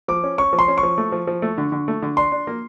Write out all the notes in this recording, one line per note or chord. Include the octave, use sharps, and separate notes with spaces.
F3 D6
C#4
C#4 C#6
F3
C6
C#4
C#6
F3
A3
F3
F3
A3
D3
D3
A3
D3
D4 C6
D4
A#3